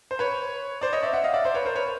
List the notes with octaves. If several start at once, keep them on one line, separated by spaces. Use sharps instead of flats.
C5
B4 C#5
C5 D5
C#5 D#5
D5 E5
E5 F#5
D#5 F5
D5 E5
C5 D5
B4 C#5
A#4 C5
B4 C#5